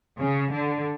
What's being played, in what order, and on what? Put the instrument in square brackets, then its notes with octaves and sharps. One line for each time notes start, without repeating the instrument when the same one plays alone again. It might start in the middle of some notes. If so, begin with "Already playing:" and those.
[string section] C#3
D3